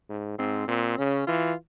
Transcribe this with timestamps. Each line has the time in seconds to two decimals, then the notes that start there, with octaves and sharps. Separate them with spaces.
0.09 G#2
0.38 G#2 C4
0.68 A#2 C4
0.98 C#3 C#4
1.27 E3 F4